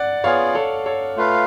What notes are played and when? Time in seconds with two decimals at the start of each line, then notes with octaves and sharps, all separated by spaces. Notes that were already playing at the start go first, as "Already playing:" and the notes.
Already playing: D5 F#5
0.24 B3 F4 G#4 C#5 F5
0.55 A4 C#5
0.86 A4 C#5
1.16 A3 F4 B4 F5